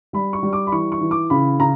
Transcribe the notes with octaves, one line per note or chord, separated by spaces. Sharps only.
G3 B5
C#6
G3
D6
B5
E3 C#6
C#6
E3
D6
C#3 B5
C#3 A#5